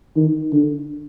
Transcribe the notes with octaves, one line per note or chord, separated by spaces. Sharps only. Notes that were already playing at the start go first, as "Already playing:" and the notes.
D#3
D3